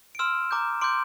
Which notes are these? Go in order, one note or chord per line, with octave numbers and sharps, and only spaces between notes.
D7
C6 E6 F6 E7
A#5 D6 G6
C6 D6 G6 D7